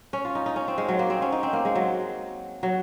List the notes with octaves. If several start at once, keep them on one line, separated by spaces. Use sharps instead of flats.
C#4
F4
D#4
D#4
C#4
C4
G#3
F#3
A#3
C4
C#4
D#4
C4
A#3
G#3
F#3
F#3